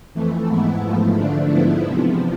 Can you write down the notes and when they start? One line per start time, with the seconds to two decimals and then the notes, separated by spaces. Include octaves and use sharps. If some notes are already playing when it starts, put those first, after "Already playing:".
0.14 F2 E3 A3
0.48 G#2 E3 B3 E4
0.83 G#2 F3 A3
1.16 D3 A3 D4
1.50 G#2 F3 B3 E4
1.85 E2 C3 F3